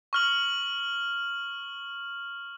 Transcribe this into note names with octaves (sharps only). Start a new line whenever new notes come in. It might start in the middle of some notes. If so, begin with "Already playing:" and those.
C#6 F6 F#7